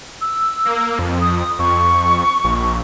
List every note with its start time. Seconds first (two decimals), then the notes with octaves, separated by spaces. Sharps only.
0.21 E6
0.66 A#3
0.99 F2
1.21 D#6
1.59 F2 C#6
2.44 A#1